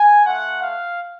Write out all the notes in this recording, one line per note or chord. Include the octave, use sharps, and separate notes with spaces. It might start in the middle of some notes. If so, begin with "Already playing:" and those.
Already playing: G#5
A3 F4 F#5
F5